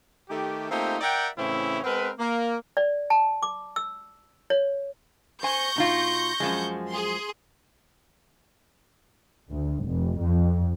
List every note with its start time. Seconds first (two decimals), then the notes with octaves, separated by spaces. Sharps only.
0.29 D#3 A3 G4
0.70 A3 A#3 C4 D#4 F4 G4
1.01 A#4 D5 E5 F#5 G5
1.37 A2 C#3 E3 C4 C#4 E4
1.84 G#3 B3 C4 A#4 B4
2.19 A#3
2.77 D5
3.10 A5
3.43 D6
3.76 E6
4.50 C#5
5.43 C5 G#5 C#6 G6 A#6
5.76 B2 D#4 F4
6.40 F#2 F3 G#3
6.89 G#4 C6
9.51 D2
9.84 F1
10.20 F2